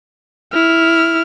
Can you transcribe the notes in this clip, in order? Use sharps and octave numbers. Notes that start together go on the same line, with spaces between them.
E4 F6